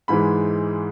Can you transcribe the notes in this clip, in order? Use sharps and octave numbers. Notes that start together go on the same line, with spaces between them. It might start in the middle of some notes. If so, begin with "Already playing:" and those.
G#2 E3 G#3 B5